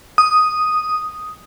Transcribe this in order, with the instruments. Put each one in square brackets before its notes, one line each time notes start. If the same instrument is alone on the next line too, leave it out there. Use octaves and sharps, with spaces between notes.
[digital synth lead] D#6